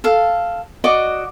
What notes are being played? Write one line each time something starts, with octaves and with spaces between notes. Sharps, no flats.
A4 F5
F#4 D5 D#5 D6